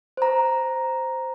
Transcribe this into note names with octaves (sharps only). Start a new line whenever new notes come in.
C5 A#5